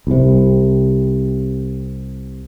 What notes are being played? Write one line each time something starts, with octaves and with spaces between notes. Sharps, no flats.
C2 C3